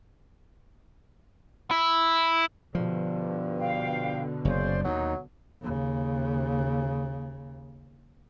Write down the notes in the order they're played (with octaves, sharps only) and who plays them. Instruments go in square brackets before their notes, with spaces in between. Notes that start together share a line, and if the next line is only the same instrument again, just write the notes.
[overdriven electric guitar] E4
[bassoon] G2 [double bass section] B2 D3 [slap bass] F3
[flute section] F5 G5
[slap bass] F#1 [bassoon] C#3 [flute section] C5 D5
[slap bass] D#2 [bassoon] F#3 [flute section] D#4
[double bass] D#2 C#3